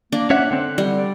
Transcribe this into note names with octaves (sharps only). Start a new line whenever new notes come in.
A#3 D4
C#4 C#5 E5 F#5
D3 C4 F#5
G3
D5